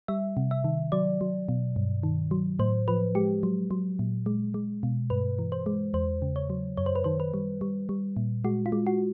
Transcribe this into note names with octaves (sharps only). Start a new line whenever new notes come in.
G3 E5
C3
E5
D#3
F#3 D5
F#3
B2
G2
D#3
F#3
A2 C5
F3 B4
G#3 G4
F#3
F#3
A#2
G#3
G#3
B2
G2 B4
E3
C5
G#3
E2 C5
C#3
C#5
F#3
F#2 C#5
C5
B4
D#3 C5
B4
G3
G3
G3
A#2
G#3 F#4
F4
G#3
F#4